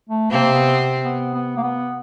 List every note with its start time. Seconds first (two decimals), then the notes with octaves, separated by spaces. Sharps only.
0.09 A3
0.31 C3 A#3 C4
0.53 B3
1.04 B3
1.34 B3
1.57 A#3
1.63 B3